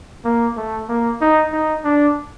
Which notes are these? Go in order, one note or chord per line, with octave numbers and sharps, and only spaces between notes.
A#3
A3
A#3
D#4
D#4
D4